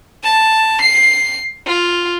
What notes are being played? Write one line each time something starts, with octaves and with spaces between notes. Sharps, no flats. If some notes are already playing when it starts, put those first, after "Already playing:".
A5
C7
F4